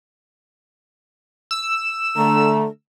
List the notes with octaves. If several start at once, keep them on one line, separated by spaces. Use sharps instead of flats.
E6
D3 A3 A#5